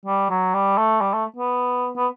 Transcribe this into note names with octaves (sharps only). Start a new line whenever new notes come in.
G3
F#3
G3
A3
G3
A3
B3
B3